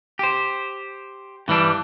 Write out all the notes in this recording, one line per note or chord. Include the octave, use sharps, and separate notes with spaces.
G4 C5
G2 E3 G3 D4